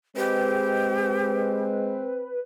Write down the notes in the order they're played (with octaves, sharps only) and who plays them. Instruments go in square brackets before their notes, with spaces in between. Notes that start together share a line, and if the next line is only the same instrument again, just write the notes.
[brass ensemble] G#3 [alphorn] C4 [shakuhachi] G4 [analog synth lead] B4